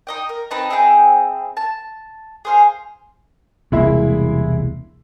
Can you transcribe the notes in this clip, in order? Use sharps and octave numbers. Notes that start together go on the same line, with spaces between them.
D#4 D#5 G5
A#4
C4 D#4 B4 A5
C4 E4 G#4 G5
A5
G#4 C5 F5
E1 C2 G#3 A#3 E4 E5